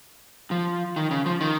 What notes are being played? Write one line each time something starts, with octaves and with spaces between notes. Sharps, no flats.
F3
D#3
C#3
F3
D#3